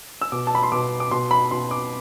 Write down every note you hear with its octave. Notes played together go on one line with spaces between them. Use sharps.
E6
B2 D6
A5
B5
C6
B2 D6
D6
B2 C6
B5
B2 C6
D6